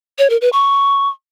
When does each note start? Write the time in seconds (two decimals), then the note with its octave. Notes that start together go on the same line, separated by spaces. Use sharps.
0.19 C#5
0.30 A#4
0.41 B4
0.53 C#6